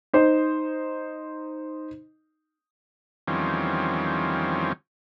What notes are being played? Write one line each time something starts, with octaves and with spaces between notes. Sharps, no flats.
D#4 C5
E2 D#3 F3 G3 C4 C#4